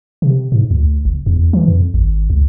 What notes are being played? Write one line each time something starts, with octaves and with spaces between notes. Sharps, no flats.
C3
G#2
D2
F#1
E2
E3
F2
G#1
C#2